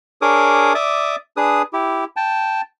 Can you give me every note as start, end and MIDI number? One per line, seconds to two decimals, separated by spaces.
0.22 0.73 62
0.22 0.73 68
0.22 0.73 70
0.22 0.73 73
0.22 0.73 86
0.22 0.73 87
0.75 1.16 74
0.75 1.16 76
0.75 1.16 86
0.75 1.16 87
1.37 1.62 62
1.37 1.62 68
1.37 1.62 71
1.37 1.62 87
1.73 2.04 64
1.73 2.04 67
2.16 2.61 79
2.16 2.61 81